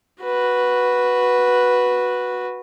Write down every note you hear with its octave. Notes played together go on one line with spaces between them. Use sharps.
F#4 B4